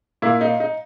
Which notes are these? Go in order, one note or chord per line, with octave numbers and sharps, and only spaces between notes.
A#2 A#3 E4
D#4
D#4